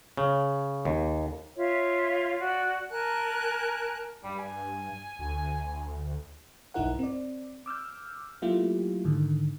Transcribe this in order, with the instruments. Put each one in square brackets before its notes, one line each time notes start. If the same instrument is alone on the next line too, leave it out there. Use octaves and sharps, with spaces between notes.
[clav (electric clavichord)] C#3
D#2
[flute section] F4 C#5 E5
F#4 D5
A#4 G#5 A5 F#6
[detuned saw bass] G2 [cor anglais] G3
[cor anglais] G#5
[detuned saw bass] D2
[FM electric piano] B1 G2 D#4 E4 A#4 F#5
C4 D5
D6 E6 F6 G6
F#3 A3 A#3 E4 F4 G4
G#2 D3 D#3